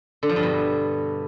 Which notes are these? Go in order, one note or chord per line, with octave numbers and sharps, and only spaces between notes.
D3
F3
G2
B2